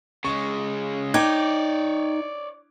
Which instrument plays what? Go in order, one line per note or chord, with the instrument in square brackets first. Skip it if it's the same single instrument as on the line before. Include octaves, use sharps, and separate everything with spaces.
[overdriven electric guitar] C#3 G#3 [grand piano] C#6
[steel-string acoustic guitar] D#4 [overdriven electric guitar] C#5 D5 [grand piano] G5 D6 G#6